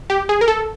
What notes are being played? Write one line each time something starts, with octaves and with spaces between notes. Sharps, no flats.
G4
G#4
A#4
A4